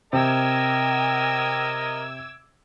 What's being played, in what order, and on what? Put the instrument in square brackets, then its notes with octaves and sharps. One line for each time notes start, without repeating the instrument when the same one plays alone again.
[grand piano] C3 [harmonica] A#4 D#5 [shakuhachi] G5 [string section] D6 E6 G#6